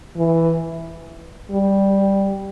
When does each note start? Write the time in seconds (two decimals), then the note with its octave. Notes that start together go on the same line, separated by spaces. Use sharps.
0.17 E3
1.51 G3